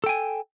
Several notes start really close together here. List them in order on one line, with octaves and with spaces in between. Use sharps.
A4 G5 G#5